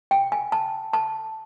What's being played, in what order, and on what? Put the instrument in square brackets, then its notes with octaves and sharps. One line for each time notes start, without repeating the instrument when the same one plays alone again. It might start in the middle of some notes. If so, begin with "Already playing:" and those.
[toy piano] G5
G#5
A5
A5